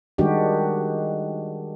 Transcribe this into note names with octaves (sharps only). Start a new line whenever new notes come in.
D#3 G3 G#3 D4 F#4 G4